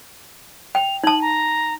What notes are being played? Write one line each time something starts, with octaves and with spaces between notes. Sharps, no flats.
G5 F7
D#4 A5 F#7
A#5